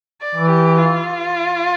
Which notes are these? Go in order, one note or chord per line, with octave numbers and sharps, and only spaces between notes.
D5
E3
G4
F4